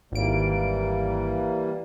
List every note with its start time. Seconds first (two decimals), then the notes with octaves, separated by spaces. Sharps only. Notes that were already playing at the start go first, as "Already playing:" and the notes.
0.12 G#1 E3 G3 A#3 D7